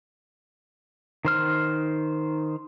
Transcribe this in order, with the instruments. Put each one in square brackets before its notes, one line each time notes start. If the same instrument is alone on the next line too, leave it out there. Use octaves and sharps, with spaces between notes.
[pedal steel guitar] D#3 C5 F6